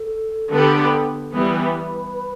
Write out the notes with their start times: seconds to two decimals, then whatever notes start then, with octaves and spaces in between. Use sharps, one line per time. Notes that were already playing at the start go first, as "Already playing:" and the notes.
Already playing: A4
0.53 D3 B3 G4
1.33 E3 G3 B3 B4